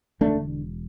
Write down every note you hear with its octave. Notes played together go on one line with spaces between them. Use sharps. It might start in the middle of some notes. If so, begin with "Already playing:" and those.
E1 D2 D3 A3 D4